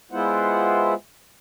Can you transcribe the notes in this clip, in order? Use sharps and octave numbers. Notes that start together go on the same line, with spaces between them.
G#3 B3 E4 F4 C5 F#5